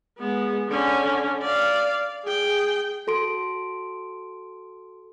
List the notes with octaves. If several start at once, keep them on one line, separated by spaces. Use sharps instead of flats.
G#3 B3
D3 C#4
D5 F5
G#4 G5
F#4 A4 C6 D7